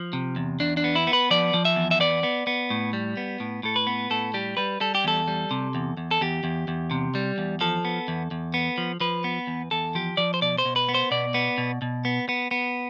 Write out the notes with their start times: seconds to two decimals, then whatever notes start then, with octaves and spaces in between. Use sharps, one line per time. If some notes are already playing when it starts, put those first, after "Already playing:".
Already playing: F3
0.13 C3
0.36 E2
0.60 E2 D4
0.77 D4
0.84 B3
0.95 E4
1.07 B3
1.13 B4
1.31 F3 D5
1.54 F3
1.65 E5
1.76 E2
1.91 E5
2.00 B3 D5
2.23 B3
2.47 B3
2.70 A2
2.93 G3
3.17 B3
3.40 A2
3.63 A2 A4
3.76 B4
3.87 B3
4.11 A2 A4
4.34 G3 G4
4.57 G3 B4
4.81 G3 A4
4.95 G4
5.04 E2 A4
5.28 G3
5.51 C3
5.75 E2
5.97 E2
6.11 A4
6.21 E2 G4
6.44 E2
6.68 E2
6.91 C3
7.15 G3
7.38 E2
7.61 F3 A4
7.85 B3
8.08 E2
8.31 E2
8.54 B3
8.78 F3
9.00 F3 B4
9.24 B3
9.47 E2
9.71 E2 A4
9.95 F3 G4
10.17 F3 D5
10.34 C5
10.42 B2 D5
10.58 C5
10.65 B2
10.76 B4
10.89 B3
10.94 C5
11.11 B2 D5
11.34 B3
11.58 B2
11.82 B2
12.05 B3
12.29 B3
12.51 B3